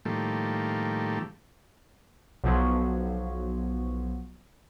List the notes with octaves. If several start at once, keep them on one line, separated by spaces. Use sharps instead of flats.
A2 D#3 F3 G3 A3 A#3
B1 B2 F3 F#3